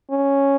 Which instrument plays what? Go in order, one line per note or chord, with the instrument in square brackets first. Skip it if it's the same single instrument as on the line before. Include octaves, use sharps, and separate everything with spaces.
[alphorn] C#4